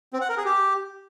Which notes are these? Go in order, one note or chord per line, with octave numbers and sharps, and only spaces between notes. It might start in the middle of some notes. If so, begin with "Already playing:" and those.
C4
F#5
A#4
G#4
G4